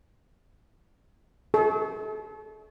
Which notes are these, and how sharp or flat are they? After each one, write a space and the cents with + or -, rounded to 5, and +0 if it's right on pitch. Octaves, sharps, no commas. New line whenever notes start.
A4 -35